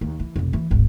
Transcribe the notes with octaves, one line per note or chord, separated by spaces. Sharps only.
D#2
E3
F1 B1
E3
D1 G#1